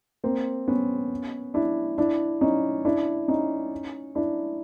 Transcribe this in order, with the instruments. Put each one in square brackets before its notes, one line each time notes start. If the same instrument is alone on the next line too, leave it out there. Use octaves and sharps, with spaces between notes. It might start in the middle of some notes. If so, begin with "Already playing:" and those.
[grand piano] A#3 C4
B3 C#4
D4 E4
D4 E4
C#4 D#4
D4 E4
C#4 D#4
D4 E4